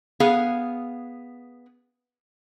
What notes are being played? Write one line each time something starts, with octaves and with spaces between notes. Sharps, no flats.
B3 G#4 F5